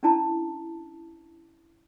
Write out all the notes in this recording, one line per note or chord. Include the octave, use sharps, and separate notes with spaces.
C#4 D4 E4 A5 A#5